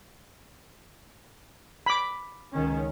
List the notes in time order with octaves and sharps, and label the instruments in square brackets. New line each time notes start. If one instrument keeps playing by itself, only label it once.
[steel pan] B5 D6
[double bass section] C#2 D#3 C#4